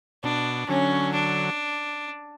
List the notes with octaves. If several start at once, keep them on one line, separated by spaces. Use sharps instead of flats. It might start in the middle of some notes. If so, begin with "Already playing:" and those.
B2 D4
D3 F#3 C#4
D4